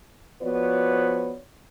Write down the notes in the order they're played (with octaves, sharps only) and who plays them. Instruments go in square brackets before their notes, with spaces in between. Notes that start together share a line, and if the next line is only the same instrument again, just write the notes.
[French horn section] F3 B3 F#4 B4 C#5 D5